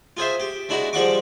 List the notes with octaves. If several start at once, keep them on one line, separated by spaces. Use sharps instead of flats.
F4 G#4 C5 E5
G4
G#3 D4 E4 F#4
F3 G3 G#3 F#5 C#6 D6